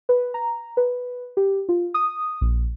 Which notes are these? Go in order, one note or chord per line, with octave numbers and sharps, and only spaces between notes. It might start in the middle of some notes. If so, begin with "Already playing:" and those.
B4
A#5
B4
G4
F4
D#6
A#1